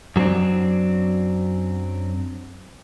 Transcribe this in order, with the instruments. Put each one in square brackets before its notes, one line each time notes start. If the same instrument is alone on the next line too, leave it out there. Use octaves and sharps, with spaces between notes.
[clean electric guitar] F#2 F#3 G3 C4 D4